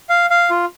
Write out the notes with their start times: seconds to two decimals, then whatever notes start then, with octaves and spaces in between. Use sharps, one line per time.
0.09 F5
0.30 F5
0.50 F4